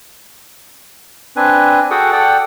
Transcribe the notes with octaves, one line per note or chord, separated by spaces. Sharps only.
C4 D4 B4 G#5
F#4 G#4 A4 F#5 G5
A4 D5 F#5 G5